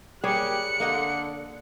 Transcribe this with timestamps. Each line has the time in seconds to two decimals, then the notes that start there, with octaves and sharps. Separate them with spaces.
0.24 G3 A#3 G4 G#4 C#5 F#6 C#7
0.80 D3 A#3 D#5 F#5